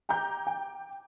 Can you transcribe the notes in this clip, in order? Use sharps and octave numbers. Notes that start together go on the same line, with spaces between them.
G5 A#5 D6 G6
G5